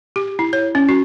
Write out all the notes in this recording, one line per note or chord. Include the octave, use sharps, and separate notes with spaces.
G4
E4
C#5
C#4
F#4